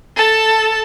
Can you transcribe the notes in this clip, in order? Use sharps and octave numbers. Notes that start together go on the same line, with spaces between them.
A4 A5